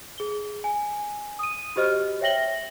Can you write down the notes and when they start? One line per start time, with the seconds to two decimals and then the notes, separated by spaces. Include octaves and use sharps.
0.18 G#4 G7
0.64 G#5
1.39 D#6 D#7
1.76 F#4 G4 C5 D#5 F6
2.21 C#5 E5 G5 A#6 F#7 G7